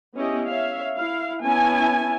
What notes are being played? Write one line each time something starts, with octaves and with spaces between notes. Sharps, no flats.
B3 C#4 E4 G4 D#5
C#5 E5 F5
E4 F5
B3 C#4 E4 G#5 A5